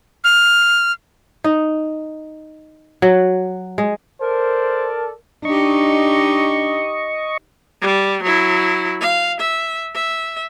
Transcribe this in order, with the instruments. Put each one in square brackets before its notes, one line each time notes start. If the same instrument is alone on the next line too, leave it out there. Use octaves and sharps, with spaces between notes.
[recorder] F6
[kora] D#4
F#3
G#3
[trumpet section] A4 D5 A5 [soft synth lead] A#4 [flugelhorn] C5
[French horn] D4 [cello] D#4 G4 [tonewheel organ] D#5 C#6
[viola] G3
F#3 E4
F5
E5
E5